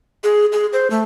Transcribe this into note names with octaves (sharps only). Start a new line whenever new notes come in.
G#4
G#4
C5
A3